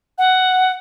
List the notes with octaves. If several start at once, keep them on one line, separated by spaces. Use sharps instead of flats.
F#5